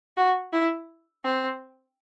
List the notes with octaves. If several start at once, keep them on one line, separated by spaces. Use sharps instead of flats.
F#4
E4
C4